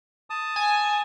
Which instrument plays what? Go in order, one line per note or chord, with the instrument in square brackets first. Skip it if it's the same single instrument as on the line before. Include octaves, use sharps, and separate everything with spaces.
[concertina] A5 D#6
[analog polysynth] G#5